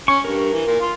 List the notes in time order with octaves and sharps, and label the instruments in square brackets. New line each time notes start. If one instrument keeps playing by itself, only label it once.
[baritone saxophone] C#4 [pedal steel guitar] C#6
[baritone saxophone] G2 [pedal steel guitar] A#4
[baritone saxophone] E3
A#2
F4